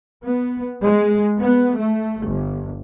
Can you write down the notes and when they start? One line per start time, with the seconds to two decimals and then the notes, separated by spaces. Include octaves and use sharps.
0.25 B3
0.82 G#3
1.41 B3
1.78 A3
2.22 G1